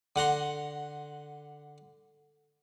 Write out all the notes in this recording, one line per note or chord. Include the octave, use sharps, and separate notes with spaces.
D3 F#5 A#5 C6